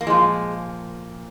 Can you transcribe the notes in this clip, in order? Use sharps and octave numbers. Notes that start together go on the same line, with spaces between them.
A#3
A#2 F3 G#3